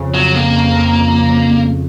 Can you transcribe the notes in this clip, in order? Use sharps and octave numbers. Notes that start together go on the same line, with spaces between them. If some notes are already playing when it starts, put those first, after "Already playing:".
Already playing: F2 C#3
C#3 F#3
F2 A#3
F2
F2